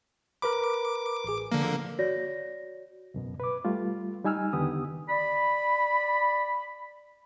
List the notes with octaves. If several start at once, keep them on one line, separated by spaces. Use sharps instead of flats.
A#4 B4 B5 D6
A1 G#4
D3 F3 A#3
F#4 C#5 D5 A#6
C#2 F#2 B2
B4 D6
G3 A3 F4
G3 D#4 G#5 E6 F6
E2 D3 D#3 B3 G4 D#6
D5 B5